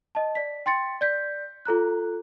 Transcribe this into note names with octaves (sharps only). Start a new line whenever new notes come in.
D#5 A5
D5 B6
G5 C6 A6 C#7
D5 G6 B6
F4 A4 A#5 F#6